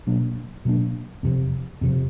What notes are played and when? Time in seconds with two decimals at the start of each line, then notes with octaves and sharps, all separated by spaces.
0.07 B2 F#3 A#3 D4
0.65 B2 F#3 A#3 D4
1.23 F2 C3 F3
1.81 F2 C3 F3